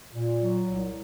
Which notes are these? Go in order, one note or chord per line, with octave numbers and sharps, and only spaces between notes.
A#2
F#3
C2